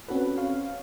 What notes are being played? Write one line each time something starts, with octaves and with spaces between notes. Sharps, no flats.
C4 C#4 F#4 A4 B4
C#5 F5